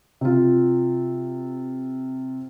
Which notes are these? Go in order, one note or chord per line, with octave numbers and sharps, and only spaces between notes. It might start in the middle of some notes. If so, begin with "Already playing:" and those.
C3 F4